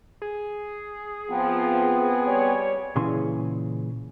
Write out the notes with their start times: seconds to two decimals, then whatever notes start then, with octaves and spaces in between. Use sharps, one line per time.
0.22 G#4
1.29 F3 B3 C4
2.26 G3 C#5
2.96 A#2 C#3 E3 G#4 C6